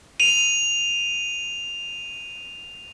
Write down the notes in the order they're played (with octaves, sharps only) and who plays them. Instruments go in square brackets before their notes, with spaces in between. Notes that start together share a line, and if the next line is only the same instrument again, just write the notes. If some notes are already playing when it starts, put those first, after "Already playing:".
[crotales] D#7 F7